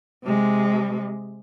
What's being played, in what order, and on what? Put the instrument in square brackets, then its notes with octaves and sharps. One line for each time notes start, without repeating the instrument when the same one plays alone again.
[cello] C3 G#3